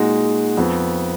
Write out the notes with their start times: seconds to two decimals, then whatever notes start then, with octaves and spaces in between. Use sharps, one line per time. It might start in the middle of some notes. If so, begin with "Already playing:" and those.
Already playing: A#2 G#3 D#4 F#4
0.57 F2 F3 B3